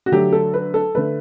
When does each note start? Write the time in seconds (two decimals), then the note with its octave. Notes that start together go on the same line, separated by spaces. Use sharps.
0.06 F#4
0.12 D3 F#3 A3 G4
0.33 A4
0.54 B4
0.74 A4
0.95 D3 A3 B4